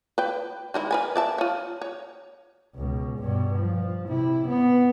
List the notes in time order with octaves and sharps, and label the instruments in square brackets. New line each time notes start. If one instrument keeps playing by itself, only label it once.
[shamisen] B4 G5
D#3 G#3 E4
A#4 B4 G#5
D5 E5 A5
F4 C#5
C#5
[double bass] C#2 B2
G2 B2
F3
C3 E4
B3